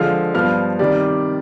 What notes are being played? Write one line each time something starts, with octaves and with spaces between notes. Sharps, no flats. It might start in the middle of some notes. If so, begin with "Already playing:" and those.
Already playing: D3 F3 G#3 F5 F6
G2 F3 B3 F5 F6
C3 D#3 G3 D5 D6